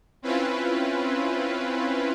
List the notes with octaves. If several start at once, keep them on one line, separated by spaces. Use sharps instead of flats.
C4 C#4 E4 F4 B4